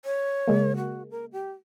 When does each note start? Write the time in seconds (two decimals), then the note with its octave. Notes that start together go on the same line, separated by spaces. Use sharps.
0.05 C#5
0.47 C#3 G#3 A#3
0.77 F#4
1.11 A#4
1.32 G4